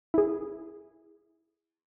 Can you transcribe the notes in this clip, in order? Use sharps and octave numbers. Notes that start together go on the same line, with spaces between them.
E4 G#4